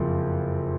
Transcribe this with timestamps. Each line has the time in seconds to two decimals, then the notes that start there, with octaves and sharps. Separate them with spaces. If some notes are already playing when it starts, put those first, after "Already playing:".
Already playing: F#1 F2 F3